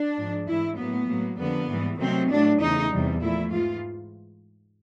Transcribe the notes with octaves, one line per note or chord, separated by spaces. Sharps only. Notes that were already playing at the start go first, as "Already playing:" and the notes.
Already playing: D4
G#2 F3 G#3
G#2 E3 A3 E4
A2 F#3 A#3 B3
A2 F#3 A#3
F2 D3 G3 A#3 B3
G#2 E3 G3
C3 D#3 F#3 A3 C4
A2 F#3 A3 D4
E2 C#3 E3 A3 D#4
E2 C3 E3 G3
A#2 F3 A3 E4
G#2 E3 F4